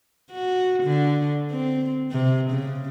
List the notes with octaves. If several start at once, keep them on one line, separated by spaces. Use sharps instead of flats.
F#4
D3
C4
C3
C#3